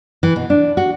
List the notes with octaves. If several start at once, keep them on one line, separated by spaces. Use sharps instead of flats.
E3
B2
D4
F#4